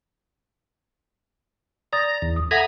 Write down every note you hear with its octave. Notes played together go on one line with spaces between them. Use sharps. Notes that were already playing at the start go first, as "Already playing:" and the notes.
D5 A#5 D#6 A6
E2
D#6
A4 E5 F#5 G#5 A#5 B5